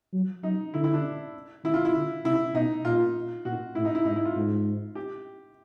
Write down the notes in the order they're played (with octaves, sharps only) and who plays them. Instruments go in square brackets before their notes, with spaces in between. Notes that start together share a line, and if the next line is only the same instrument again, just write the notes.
[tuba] F#3
[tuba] F#3 [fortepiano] D#4
[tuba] D3 [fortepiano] E4
[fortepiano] E4
D4
[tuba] D#3 [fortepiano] E4
[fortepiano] F4
E4
[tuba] D3
[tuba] C3 [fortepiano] E4
[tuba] B2 [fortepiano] D#4
[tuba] A#2 [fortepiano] F4
[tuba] A#2 [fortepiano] F#4
[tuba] A2 [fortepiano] E4
[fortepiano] D#4
E4
[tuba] G#2 [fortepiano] D#4
[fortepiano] E4
F4
[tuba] G#2
[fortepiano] G4